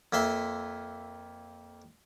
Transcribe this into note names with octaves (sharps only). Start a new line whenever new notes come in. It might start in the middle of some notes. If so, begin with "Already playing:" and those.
F2 A#3 E5 C6